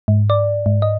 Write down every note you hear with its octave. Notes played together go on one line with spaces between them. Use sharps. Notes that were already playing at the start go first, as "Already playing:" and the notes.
G#2
D5
G#2
D#5